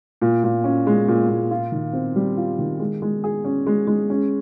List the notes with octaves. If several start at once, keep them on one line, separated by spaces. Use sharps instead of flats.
A#2
A#2
C#4
G#3
A#2
A#2
F4
D#3
C4
G3
F4
D#3
G#3
G#3
G#4
C#4
G#3
G#3
C#4